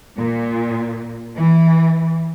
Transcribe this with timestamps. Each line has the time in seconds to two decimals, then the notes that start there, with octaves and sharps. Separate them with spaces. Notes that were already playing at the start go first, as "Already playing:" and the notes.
0.16 A#2
1.35 E3